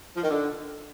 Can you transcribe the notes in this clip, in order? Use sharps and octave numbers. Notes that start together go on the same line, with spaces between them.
F3
D#3
D3